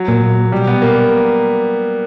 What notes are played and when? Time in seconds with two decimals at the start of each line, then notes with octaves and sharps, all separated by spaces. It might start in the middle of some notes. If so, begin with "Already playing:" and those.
Already playing: F#3
0.08 A#2
0.52 B2 G3
0.67 B3
0.82 A#3